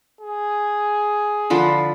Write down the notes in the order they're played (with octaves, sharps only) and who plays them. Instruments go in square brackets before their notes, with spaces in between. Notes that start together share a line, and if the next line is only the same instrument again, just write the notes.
[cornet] G#4
[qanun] D3 F3 B4